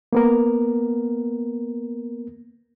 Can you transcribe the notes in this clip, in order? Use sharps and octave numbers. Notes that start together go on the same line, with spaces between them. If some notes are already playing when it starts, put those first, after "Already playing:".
A#3 B3 A#4